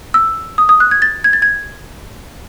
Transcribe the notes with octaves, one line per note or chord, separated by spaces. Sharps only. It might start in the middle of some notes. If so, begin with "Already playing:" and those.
E6
D#6
D#6
F#6
G#6
A6
G#6
A6
G#6